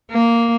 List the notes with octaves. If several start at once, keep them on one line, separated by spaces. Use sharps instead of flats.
A#3